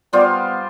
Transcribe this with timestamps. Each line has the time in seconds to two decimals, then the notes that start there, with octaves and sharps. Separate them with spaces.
0.13 G3 B3 F4 C5 D5